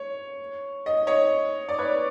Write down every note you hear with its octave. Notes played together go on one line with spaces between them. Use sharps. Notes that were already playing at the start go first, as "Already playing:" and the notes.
Already playing: C#5
D#5
C#5 D#5
D5
B4 C#5